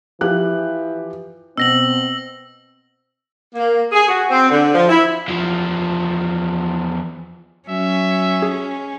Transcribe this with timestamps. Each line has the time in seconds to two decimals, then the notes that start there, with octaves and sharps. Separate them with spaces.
0.21 E3 F3 G4 F#6
1.57 B2 C4 E6 A#6 F#7
3.55 A#3
3.92 G#4
4.08 F#4
4.31 C4
4.50 D3
4.75 F3
4.89 E4
5.28 E2 F3
7.69 F#3 C#4 E5
8.42 G#4